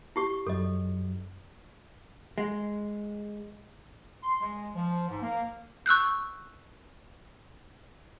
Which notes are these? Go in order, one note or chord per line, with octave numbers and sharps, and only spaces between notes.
E4 G4 C#6
F#2 F#3 A4 D#5
G#3
C6
G#3
F3
G#2
A#3
C#6 E6 F#6 G6